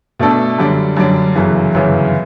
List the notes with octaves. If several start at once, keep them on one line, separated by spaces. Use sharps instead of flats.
B2 A3 D4 A4
F#2 D3 G3 D4
F#2 D3 G3 D4
G1 F#2 C#3 E3
G1 F#2 C#3 E3